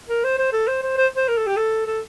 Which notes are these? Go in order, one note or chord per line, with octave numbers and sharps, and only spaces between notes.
A#4
C5
C5
A4
C5
C5
C5
C5
A#4
A4
G4
A4
A4